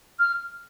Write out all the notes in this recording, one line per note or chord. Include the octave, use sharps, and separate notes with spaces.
F6